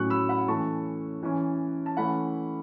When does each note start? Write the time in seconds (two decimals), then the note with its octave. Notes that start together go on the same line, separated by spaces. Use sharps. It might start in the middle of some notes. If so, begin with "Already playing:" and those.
Already playing: A2 F#3 C#4 C#6 F#6
0.10 B5 E6
0.29 F#5 B5
0.48 E3 A3 C#4 A5 C#6
1.23 E3 C#4
1.86 A5
1.97 E3 A3 C#4 F#5 B5